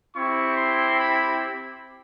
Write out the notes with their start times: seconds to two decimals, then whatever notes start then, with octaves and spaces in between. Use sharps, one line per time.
0.15 C4 E4 G4 C#6
0.57 C6
0.99 B5